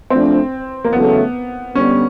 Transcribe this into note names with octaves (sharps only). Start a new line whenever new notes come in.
F3 A3 C4 D4
A#3
E2 C#3 F#3 A3 B3
D3 G3 B3 C#4